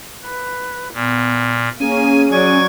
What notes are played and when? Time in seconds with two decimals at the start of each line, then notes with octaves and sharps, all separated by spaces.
0.25 B4
0.94 A#2 B3
1.80 A#3 C#4 G#4 G#5 D#7
2.31 F#3 D5 C#6 G#6